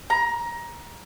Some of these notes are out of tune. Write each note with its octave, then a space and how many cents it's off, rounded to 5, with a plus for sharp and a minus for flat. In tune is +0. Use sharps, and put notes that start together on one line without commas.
A#5 +20